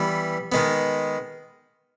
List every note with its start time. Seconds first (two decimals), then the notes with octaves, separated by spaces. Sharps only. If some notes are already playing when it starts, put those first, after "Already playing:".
Already playing: E3 G3 B3
0.52 D#3 G#3 B3